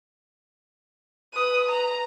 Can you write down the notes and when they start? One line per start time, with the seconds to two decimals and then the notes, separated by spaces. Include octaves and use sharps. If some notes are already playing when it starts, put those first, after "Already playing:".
1.34 B4 D#6
1.69 A#5